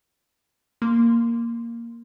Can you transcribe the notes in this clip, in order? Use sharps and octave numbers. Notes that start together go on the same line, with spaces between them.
A#3 C6